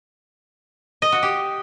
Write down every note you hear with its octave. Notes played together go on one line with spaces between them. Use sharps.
D#5
F#4
G4